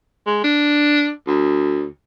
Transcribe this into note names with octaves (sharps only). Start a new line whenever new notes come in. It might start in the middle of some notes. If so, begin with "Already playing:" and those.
G#3
D4
D2